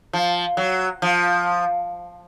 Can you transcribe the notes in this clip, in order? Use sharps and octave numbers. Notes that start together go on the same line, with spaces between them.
F3
F#3
F3